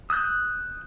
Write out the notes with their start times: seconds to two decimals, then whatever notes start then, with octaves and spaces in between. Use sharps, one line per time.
0.10 D#6 E6 F#6 G6